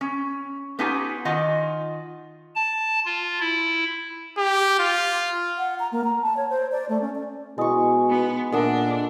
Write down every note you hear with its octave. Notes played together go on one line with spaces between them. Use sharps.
C#4
B3 C#4 D#4 F4 G4 G#5
D#3 F4 D#5 F#5 G#5
A5
F4
E4
G4
F4
F#5
A#5
A#3
A#5
A5
C#5
C5
D5
A3
C#4
D5
B2 G#3 E4 C#6 D#6
B3 D#4
A#2 D4 A4 A#4 E5 F#5 D#6 E6